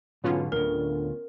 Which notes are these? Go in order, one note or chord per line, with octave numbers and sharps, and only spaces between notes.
B1 G#2 D3 B3 C#4 F4
D2 A2 D3 A#4